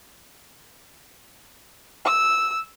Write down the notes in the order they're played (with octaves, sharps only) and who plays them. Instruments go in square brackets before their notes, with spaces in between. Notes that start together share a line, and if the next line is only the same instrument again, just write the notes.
[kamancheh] E6